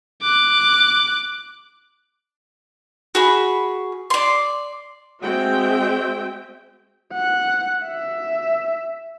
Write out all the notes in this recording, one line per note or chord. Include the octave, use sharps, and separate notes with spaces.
D6 F#6
F#4 G#4 B5
D5 C6
G#3 C4 F#4 E5 G5
F#5
E5